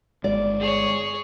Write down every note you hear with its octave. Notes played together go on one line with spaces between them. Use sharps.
G1 G#3 D5
G#4 C#5